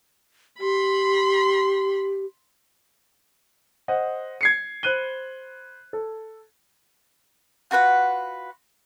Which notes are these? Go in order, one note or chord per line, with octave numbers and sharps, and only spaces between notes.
G4 B5 C6
C5 D#5 F#5
G#6 C7 C#7
C5 B5 F#6 D#7 G7
A4
F4 F#4 B4 F#5